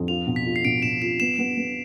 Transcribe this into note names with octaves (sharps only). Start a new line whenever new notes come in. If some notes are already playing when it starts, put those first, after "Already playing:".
Already playing: F2
F4 F7
B2
B6
F4
C7
B2 D7
B2 E7
F4 E7
B3 E7
B3
B3